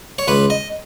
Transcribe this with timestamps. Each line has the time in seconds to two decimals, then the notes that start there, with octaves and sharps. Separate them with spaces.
0.19 C#5
0.28 C#2 B4
0.50 D#5